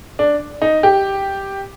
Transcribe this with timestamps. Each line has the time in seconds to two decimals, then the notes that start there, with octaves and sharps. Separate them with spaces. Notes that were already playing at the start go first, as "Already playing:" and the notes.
0.19 D4
0.62 D#4
0.83 G4